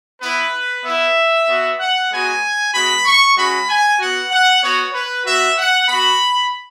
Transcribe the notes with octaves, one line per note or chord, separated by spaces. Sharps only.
B3 E4 B4
B3 E4 E5
B3 F#4
F#5
G#3 B3 F#4 G#5
G#3 B3 F#4 B5
C#6
G#3 C#4 F#4 B5
G#5
B3 F#4 F#5
F#5
B3 F#4 C#5
B4
B3 F#4 E5
F#5
B3 F#4 B5